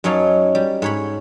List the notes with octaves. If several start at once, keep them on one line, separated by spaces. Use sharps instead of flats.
F#2 F#3 D#4 C#5 F5 A5
G3
G#2 C#5 B5